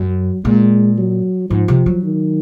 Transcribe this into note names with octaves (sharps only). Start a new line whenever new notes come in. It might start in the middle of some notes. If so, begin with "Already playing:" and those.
Already playing: F#2 F#3
A#2 G#3
F#3
G#2 F3
C3
F#3
D#3